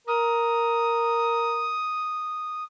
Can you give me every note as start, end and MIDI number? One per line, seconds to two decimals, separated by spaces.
0.07 1.76 70
0.07 2.63 87